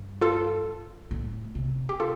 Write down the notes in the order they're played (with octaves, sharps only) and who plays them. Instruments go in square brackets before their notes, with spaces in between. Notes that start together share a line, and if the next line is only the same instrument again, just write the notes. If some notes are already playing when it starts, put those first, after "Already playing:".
Already playing: [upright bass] G2
[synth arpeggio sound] F4 A4
[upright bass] A2
C3
[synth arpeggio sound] G4
F4 A4